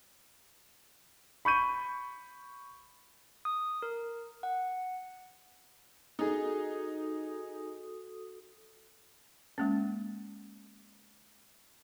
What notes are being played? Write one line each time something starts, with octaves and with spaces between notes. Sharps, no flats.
B5 C#6 G6 D#7
D#6
A#4
F#5
D#4 F#4 G#4 A4 D#6
G#3 A#3 C#4